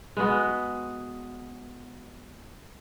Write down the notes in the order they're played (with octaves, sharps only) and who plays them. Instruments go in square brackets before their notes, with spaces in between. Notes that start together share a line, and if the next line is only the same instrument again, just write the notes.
[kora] G#3 B3 F#4